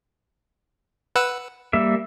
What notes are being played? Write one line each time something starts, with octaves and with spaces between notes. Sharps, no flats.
B4 F#5 E6
G3 A#3 E5